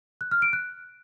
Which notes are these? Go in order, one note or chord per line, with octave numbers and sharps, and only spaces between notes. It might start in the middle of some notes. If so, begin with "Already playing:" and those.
F#6
F6
D7
F#6